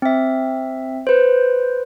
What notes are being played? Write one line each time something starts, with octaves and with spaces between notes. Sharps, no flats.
C4 E5
B4 C5